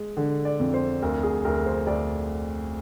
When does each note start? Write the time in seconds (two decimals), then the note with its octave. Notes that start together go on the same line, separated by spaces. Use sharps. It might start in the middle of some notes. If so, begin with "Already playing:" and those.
Already playing: G#3
0.17 D3
0.45 D5
0.60 F2
0.74 C5
1.02 D2 A#4
1.23 G#4
1.45 D2 A#4
1.66 C5
1.87 D2 D5